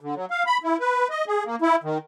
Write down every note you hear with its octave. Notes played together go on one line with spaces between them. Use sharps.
D3
F#3
F5
B5
E4
B4
D#5
G#4
A#3
E4
D#3